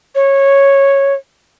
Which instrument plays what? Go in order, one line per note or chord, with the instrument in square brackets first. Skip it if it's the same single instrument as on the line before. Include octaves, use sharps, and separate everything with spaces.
[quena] C#5